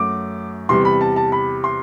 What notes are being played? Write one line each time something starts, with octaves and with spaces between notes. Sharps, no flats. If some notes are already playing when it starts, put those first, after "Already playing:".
Already playing: F#2 F#3 A3 D6
E2 C3 G3 C6
B5
A5
A5
B5
C6